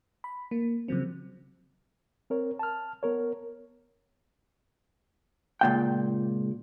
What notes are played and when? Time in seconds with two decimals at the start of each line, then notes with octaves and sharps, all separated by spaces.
0.24 B5
0.51 A#3
0.88 C#3 F3 F#3 C4
2.30 C4 A#4 C#5
2.59 A5 F6
3.03 B3 A#4 C#5
5.61 C#2 A#2 G5